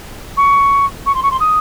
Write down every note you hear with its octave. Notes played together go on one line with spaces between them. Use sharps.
C#6
C#6
C6
C#6
C6
D#6